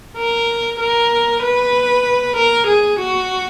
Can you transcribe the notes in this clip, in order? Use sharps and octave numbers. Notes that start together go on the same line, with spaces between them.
A#4
A#4
B4
A#4
G#4
F#4